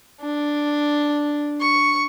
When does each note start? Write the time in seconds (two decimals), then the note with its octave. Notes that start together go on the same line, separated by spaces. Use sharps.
0.21 D4
1.60 C#6